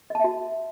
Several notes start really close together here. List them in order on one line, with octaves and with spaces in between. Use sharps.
D#5 A5 E5 F#4